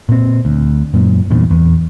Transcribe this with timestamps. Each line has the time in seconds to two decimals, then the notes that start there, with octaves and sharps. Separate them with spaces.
0.09 A#2 C4
0.45 D2
0.94 F#2 A#2
1.31 E2 G2 A#2
1.51 E2